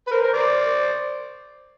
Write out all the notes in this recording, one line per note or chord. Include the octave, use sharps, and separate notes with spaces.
B4
A#4 C5
A#4 C5
C5 D5